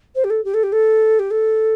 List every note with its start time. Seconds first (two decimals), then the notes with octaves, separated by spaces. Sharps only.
0.15 C5
0.24 G4
0.30 A4
0.44 G4
0.54 A4
0.63 G4
0.72 A4
1.19 G4
1.30 A4